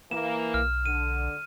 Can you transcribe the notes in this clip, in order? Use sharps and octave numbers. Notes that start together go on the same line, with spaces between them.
E3 A#3 E7
B1 F6
D3 D#7